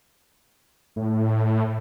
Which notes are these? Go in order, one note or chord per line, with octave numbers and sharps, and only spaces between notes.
A2